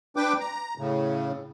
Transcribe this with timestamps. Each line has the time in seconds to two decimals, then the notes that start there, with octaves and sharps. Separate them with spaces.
0.16 D4 B4 G5 D6
0.40 A#5
0.78 A2 C#3